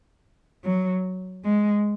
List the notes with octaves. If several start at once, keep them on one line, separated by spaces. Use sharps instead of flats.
F#3
G#3